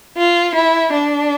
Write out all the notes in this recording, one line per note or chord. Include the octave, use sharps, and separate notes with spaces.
F4
E4
D4